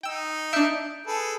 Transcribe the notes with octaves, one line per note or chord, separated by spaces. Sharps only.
D#4 G5 E6
D4 E5 G6 D7
G#4 A4 B4